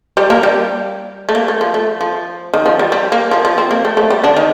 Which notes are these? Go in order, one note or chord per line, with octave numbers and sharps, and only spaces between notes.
G3 G4
A#3 A#4
G3 G4
A3
A#3
A3
F3
A3
F3
D#3
F3
G3
G3
A#3
F3
F3
C4
A#3
A3
A3
G3
D3 D4
D#3 D#4